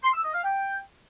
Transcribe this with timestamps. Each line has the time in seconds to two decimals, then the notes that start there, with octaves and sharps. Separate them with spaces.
0.04 C6
0.14 E6
0.24 D#5
0.34 F5
0.44 G5